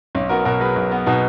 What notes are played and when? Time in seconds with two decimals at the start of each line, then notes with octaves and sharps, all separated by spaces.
0.15 B1 C#4
0.29 B3 F#4 A#4
0.45 B2 F#4 A#4
0.60 F#3 G#4 B4
0.76 B1
0.91 B3
1.06 B2 D#4 F#4